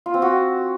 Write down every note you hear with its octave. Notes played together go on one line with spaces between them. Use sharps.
F4
C4
F#4